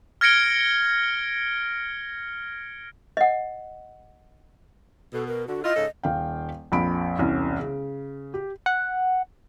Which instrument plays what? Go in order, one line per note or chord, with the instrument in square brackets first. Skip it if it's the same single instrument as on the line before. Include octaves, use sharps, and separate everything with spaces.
[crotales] F6 G#6 A#6 C#7 D7 G7
[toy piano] D#5 F#5
[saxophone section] B2 [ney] A4
[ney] A#4
[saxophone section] D3 [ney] F#4
[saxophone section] E4 F4 [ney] D#5
[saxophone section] G#2 C#3 A4
[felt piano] D#1 F5 G5
A#1 F2 B5 D7
E1 C2 C#4
C#3
G4
[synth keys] F#5